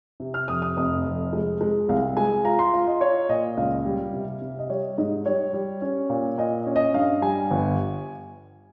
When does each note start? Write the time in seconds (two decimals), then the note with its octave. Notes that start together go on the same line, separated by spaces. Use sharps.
0.20 C3
0.34 F6
0.48 F2 D#6
0.62 D#6
0.77 F1 D#6
1.05 F2
1.33 G#3
1.61 G#3
1.89 C2 F5
2.17 G#3 G#5
2.45 F4 A#5
2.59 C6
2.73 F4
2.87 D#5
3.01 F4 C#5
3.29 A#2 D#5
3.57 C#2 F5
3.86 G3
4.13 C3
4.41 C3
4.59 D#5
4.69 G3 C#5
4.98 G#2 D#5
5.26 G3 C#5
5.54 G3
5.82 C#4
6.10 A#2
6.38 A#2 D#5
6.66 C#4
6.76 D#5
6.94 G2 F5
7.22 G3 G#5
7.51 G1